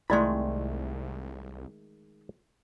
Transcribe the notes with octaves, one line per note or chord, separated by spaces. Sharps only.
C2 D#3 G#3 A3 E4 D5 B5 C6